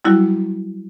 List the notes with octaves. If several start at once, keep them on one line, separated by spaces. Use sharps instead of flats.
F#3 G3 E4 F#4